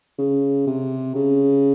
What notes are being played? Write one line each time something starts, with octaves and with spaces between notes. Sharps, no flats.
C#3
C3
C#3